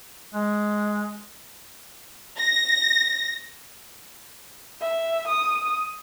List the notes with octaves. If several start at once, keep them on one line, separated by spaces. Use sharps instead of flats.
G#3
A#6
E5
D#6